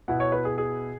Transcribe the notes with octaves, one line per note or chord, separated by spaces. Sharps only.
B2 B3 E4 F#5
C#5
B4
G#4
G#4